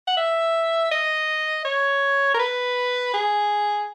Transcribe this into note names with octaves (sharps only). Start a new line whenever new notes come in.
F#5
E5
D#5
C#5
A#4
B4
G#4